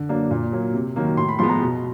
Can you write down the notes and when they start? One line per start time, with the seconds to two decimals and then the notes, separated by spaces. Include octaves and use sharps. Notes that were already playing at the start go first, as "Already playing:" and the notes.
Already playing: D3
0.09 F#3 A#3 D4
0.31 A#2
0.52 F#3 A#3
0.74 C3
0.96 D#3 F#3 A#3
1.17 A2 C6
1.28 B5
1.39 F3 G#3 B3 C6
1.49 A#5
1.61 B2